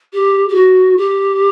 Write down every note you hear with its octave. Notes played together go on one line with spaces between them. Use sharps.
G4
G4
F#4
G4